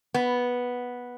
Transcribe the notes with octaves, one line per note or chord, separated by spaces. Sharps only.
B3